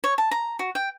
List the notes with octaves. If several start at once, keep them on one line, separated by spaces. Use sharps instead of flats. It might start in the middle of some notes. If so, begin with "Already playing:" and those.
C#5
A5
A#5
F#4
G5